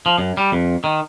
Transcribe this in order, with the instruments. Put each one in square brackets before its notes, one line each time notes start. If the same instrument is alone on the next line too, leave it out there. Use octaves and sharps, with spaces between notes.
[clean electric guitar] F3
F#2
G3
F2
D#3